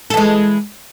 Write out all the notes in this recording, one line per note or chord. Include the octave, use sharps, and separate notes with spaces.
E3 G#3 A4